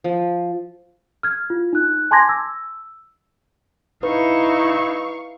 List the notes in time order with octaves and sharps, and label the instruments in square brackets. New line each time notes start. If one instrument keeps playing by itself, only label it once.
[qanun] F3
[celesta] F6 G#6
F4
D#4 F#6
G#5 A5 C6 D6 G#6 A#6
E6
[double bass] D#4 E4 [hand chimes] B4 [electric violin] F5 C#6